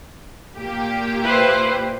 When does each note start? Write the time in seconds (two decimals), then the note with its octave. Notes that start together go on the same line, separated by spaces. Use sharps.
0.58 A#2 A#3 G4
1.23 E4 B4 C5